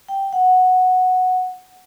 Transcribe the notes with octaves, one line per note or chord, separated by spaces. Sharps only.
G5
F#5